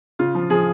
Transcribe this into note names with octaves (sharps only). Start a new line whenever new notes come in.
C#3 F4
F3
F3 G#4